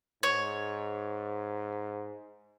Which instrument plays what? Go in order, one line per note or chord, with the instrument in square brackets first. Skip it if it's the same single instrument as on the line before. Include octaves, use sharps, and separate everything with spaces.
[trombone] G#2 [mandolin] C#5